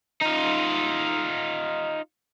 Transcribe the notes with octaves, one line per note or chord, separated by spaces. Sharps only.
D#4 F4